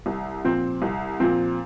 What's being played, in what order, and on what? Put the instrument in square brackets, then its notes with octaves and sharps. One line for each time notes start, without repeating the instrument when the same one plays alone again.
[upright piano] C2
A#2 F3 C4
C2
A#2 F3 C4